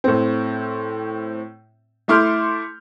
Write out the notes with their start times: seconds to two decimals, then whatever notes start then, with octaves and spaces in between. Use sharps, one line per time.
0.04 A2 C4
2.08 A3 E4 C6 D6 F6 G6